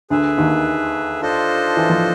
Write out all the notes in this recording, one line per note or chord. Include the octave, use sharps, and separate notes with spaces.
D2 D3 G#4 B4 E5
D#2 D#3
D4 F4 A4 C5 D#5
E3
F3